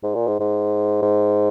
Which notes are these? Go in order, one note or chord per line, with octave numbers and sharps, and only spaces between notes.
G#2
A#2
G#2
G#2
G#2